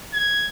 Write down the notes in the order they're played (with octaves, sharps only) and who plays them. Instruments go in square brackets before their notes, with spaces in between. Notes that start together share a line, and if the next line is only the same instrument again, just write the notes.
[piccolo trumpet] G#6